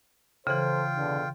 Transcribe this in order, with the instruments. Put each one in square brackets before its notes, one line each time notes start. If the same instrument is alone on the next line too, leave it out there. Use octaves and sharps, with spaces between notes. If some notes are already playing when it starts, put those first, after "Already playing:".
[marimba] C#3 E3 [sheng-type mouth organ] F4 G5 [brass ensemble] A4 C5
[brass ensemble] E2 B2 D3